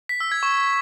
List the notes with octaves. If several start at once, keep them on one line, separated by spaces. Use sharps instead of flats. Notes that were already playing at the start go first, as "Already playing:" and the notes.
B6
E6
G#6
C#6